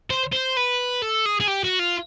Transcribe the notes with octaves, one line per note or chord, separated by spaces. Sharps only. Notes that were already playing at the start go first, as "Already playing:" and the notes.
C5
C5
B4
A4
G#4
G#4
G4
F#4
F4